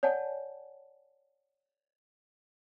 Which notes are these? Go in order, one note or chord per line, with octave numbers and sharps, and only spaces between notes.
C#5 D5 F#5 G#5 A5